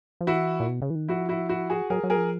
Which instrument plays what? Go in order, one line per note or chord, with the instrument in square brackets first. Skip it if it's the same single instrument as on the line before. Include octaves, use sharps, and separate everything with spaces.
[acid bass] F3
[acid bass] E3 [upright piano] E4 F#4
[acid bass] A#2
B2
C#3
E3
D#3
[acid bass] F3 [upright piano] E4 F#4
[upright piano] E4 F#4
E4 F#4
F#4 G#4
[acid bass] F#3 [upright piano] G#4 A#4
[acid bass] F#3
[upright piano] G#4 A#4
[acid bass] F3